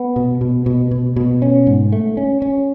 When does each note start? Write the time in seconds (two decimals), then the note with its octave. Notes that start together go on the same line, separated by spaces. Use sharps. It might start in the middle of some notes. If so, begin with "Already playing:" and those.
Already playing: B3
0.16 B2
0.41 B2
0.66 B2
0.91 B2
1.16 B2
1.42 C#4
1.67 G#2
1.92 A3
2.17 C#4
2.42 C#4